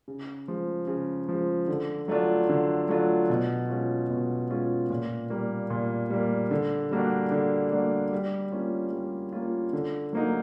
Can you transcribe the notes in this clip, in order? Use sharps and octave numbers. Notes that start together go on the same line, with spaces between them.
C#3
F3 G#3
C#3
F3 G#3
D3
F#3 A3 D4 F4
D3
F#3 A3 D4 F4
B2
G#3 C#4 F4
B2
G#3 C#4 F4
A#2
G3 A#3
A#2
G3 A#3
D3
G3 A#3 D4 F#4
D3
G3 A#3 D4 F#4
G3
A#3 C#4 F4
G3
A#3 C#4 F4
D3
F#3 A#3 D#4